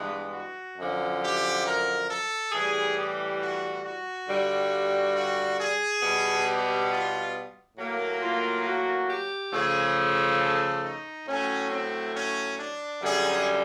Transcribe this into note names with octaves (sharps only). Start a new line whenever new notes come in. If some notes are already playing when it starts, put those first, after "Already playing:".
Already playing: G2 E3 G#3 B3
F#4
F#2 D3 F3
G4
A#4
A4
A2 E3 G3 G#4
G4
F#4
F#4
G2 D3 G3
F#4
G#4
B2 G3 B3
G4
F4
A2 F#3 A#3
F4
F#4
G4
C#3 F3 A3 G#4
A4
D#4
A2 F#3 A3 C#4
C4
C#4
D4
F#2 D3 G3 G#4